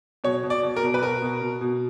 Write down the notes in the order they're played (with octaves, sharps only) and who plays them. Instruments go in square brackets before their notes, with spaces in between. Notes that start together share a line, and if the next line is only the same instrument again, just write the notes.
[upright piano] B2 C#5
B2
D5
B2
A#4
B2
B4
B2 A#4
B2
B2
B2